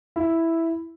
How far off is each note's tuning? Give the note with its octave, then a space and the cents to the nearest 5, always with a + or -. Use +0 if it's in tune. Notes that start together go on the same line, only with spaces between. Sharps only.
E4 +0